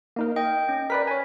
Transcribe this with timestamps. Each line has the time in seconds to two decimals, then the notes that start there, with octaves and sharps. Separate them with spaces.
0.16 A#3 D#4 A#4
0.36 D#5 G5
0.69 C#4
0.90 A#4 B4 D5 B6
1.07 C#5 G#5